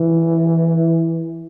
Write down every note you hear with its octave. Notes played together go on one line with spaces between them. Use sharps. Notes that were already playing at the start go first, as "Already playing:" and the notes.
Already playing: E3